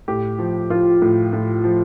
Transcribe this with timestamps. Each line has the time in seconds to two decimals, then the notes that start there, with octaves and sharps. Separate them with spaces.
0.08 A2 G4
0.39 F3
0.70 F3 F4
1.02 A2
1.33 A2
1.64 F3